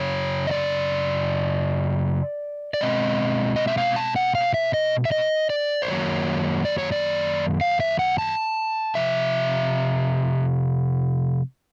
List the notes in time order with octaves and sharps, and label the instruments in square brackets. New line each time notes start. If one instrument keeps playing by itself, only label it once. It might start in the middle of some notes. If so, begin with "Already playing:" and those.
Already playing: [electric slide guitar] F#2 C#3 C#5
D#5
D5
D5
B2 G#3 C4 D#5
D#5
E5
F5
A5
F#5
F5
E5
D#5
E5
D#5
D5
C5
F#2 D#3 F#3 A#3 C#5
D5
C#5
D5
F5
E5
F#5
A5
C3 F3 E5